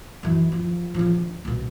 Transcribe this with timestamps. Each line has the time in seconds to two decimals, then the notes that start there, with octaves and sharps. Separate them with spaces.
0.23 F#2 E3
0.52 F3
0.94 C#3 F3
1.14 D2
1.45 C2 B2